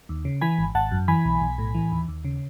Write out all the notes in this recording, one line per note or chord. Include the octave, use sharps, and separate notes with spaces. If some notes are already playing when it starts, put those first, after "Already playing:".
D#2
C#3
E3 G#5 B5
G#1
G#1 F#5 A5
F#2
E3 G#5 B5
B1
B1
A2
E3
D#2
D#2
C#3